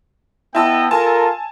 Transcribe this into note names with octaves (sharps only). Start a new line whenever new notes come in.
B3 E4 D#5 G5 A5 E6
F4 A4 A#4 G#5 A5